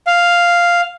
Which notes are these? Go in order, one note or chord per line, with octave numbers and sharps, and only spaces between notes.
F5